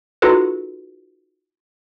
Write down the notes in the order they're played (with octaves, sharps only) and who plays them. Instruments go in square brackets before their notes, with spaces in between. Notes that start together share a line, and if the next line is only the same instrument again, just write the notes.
[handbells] D#4 F4 F#4 G#4 A4 B4